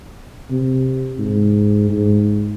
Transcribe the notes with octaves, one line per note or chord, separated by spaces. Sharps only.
C3
G#2
G#2